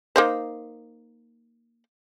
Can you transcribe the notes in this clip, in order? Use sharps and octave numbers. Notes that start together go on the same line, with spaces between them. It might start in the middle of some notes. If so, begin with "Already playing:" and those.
A#3 D#4 C5